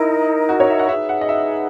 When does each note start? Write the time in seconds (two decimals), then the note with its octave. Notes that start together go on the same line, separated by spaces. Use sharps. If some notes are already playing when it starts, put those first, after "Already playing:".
Already playing: D#4 E4 A#4 D#5
0.49 F#4
0.60 C#5
0.70 E5
0.79 F#5
0.89 D#4 G#4 B4 E5
1.09 F#5
1.21 D#5
1.29 E5